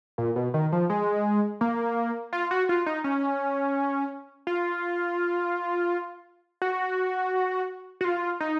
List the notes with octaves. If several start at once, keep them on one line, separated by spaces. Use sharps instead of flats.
A#2
B2
D#3
F3
G#3
A#3
F4
F#4
F4
D#4
C#4
F4
F#4
F#4
F4
D#4